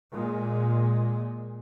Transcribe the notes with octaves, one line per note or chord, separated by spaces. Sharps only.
A#2 G#3